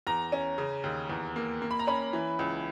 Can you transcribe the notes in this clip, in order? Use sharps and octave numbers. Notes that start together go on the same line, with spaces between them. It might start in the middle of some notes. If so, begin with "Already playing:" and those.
E2 A#5
C#4
C#3
D#2
E2
A#3
A#3
B5
A#5
C#4 B5
E3
C#2